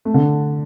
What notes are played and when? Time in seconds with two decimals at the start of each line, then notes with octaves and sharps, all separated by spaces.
0.05 A3
0.14 D3